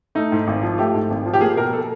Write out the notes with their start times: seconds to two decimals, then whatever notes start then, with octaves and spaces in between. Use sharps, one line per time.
0.15 A3 D#4
0.32 G#2
0.47 G#1
0.63 F3
0.78 A3 G4
0.94 G#2
1.10 G#1
1.26 F3
1.33 G4
1.41 A#3 G#4
1.56 B2 A#4
1.73 A4